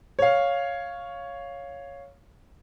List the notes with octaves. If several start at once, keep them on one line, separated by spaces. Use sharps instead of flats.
C#5 F5